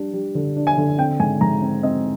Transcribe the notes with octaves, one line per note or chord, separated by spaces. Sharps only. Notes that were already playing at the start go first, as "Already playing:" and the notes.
Already playing: G3 D4
G3
D3
D4
G#5
D3
C4 G5
G#2 G#5
G#2 A#5
C4
C4 D#5